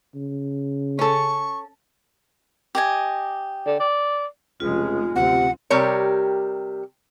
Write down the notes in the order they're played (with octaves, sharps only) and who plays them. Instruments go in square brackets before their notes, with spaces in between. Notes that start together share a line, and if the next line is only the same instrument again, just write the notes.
[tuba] C#3
[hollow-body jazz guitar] C#4 A4 [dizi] C#6
[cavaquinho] G4 D#5 G#5
[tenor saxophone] D3
D5
[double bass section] F1 G#3 [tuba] C#2 [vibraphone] F4
[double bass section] F#1 D2 C4 [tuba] C3 [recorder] F#5
[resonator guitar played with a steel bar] C3 G3 G4 A#4 C#5